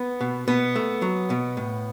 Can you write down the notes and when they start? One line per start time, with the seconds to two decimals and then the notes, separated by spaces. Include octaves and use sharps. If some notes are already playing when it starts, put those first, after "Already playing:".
Already playing: B3
0.21 B2
0.48 B2 B3
0.76 A3
1.02 F#3
1.30 B2
1.57 A2